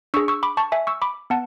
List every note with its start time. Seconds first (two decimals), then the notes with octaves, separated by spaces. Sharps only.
0.14 D4 G#4 C#6 E6
0.28 C#6 E6
0.43 B5 D6
0.57 A5 C#6
0.72 E5 G#5
0.87 C#6 E6
1.02 B5 D6
1.30 B3 F#5 A5